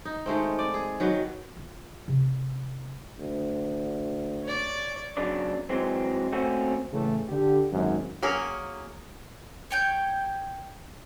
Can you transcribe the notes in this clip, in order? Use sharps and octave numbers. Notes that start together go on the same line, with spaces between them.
D#4
D#3 G#3 A3 C4
D5
G#4
D#3 F#3 B4
F4
C3
D2
C#5 D5
B1 C#3 F#3 A#3 D4 D5
E3 F#3 G#3 C4
A3 A#3 C4 C#4 F#4
A2 C#3 E3 A3
D3 G4
G#1 F#2
F#3 A#3 C#4 G#4 A#4
C#5 G5 G6